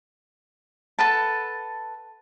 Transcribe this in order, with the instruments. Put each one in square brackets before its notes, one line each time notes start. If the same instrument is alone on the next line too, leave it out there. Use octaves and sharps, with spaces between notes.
[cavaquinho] A4 B4 F#5 A5